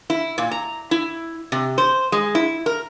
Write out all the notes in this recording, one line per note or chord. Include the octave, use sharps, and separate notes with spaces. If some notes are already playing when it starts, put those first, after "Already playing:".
E4
A#2
A#5
E4
C3
C5
G#3
E4
A#4